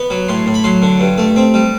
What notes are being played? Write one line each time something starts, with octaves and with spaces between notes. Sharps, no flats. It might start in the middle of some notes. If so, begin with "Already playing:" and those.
Already playing: B3
F#3
A2 C6
A2
B5
F#3 C6
D3
G2
A3
C4
G3